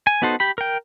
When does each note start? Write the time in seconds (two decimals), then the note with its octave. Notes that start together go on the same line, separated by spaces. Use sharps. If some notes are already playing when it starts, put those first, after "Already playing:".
0.07 G#5
0.22 B3 D#4 F#4 A4 C5
0.40 G4 B5
0.58 A#4 G5